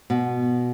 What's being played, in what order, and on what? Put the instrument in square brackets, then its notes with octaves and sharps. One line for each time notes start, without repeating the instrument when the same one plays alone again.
[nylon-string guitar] B2